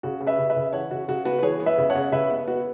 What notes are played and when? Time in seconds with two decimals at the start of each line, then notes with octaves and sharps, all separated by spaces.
0.03 C#3 F#4
0.20 C#3
0.27 B4 E5
0.39 C#3
0.50 B4 E5
0.56 C#3
0.73 E3 C#5 F#5
0.91 C#3 F#4
1.08 C#3 F#4
1.25 B3 F#4 B4
1.39 B4
1.43 E3 G#4 C#5
1.60 B3
1.66 B4 E5
1.78 C#3
1.90 C#5 F#5
1.95 C#3
2.12 C#3 B4 E5
2.30 B3
2.48 B3 F#4